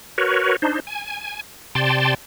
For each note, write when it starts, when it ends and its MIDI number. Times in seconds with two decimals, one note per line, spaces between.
0.18 0.56 66
0.18 0.56 70
0.18 0.56 71
0.18 0.56 73
0.62 0.80 62
0.62 0.80 63
0.62 0.80 72
0.87 1.41 80
1.75 2.14 48
1.75 2.14 74
1.75 2.14 79
1.75 2.14 81
1.75 2.14 84